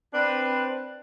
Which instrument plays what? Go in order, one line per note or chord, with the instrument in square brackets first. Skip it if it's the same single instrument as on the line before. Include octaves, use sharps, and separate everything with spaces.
[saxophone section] C4 D4 B4 C5